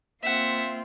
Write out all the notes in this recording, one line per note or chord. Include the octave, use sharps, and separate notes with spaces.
A#3 C4 F4 E5 F#5